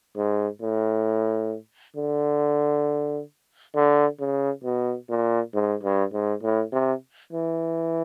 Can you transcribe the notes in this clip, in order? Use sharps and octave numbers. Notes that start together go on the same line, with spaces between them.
G#2
A2
D3
D3
C#3
B2
A#2
G#2
G2
G#2
A2
C3
E3